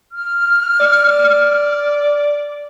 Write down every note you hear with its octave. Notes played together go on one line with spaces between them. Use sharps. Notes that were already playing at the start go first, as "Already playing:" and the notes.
F6
D5